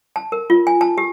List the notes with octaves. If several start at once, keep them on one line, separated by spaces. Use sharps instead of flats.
A5
A#4
F4
G#5
A5
G4